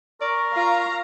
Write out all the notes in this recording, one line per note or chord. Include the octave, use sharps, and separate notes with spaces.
A#4 D5 C#6
F4 F5 A#5